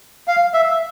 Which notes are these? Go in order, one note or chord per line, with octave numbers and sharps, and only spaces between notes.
F5
E5